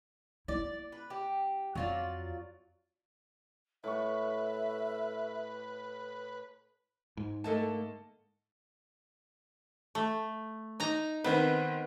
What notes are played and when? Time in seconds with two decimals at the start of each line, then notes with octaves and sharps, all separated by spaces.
0.48 A#3 E4 D5
0.92 B4
1.10 G4
1.75 F2 F#3 F4 D5
3.84 A2 B4 E5 C#6
7.17 G#2
7.44 D3 A3 A#3 A4 D#5 A5
9.95 A3
10.80 D#4 A#5
11.24 D#3 B3 C4 B4